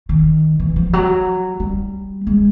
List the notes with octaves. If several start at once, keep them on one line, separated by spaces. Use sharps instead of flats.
D#3
E3
F3
F#3
G3
G#3